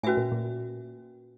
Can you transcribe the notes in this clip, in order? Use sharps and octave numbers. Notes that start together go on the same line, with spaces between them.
A2 C#4 F#4 B4 E5 G#5
A#2
A#2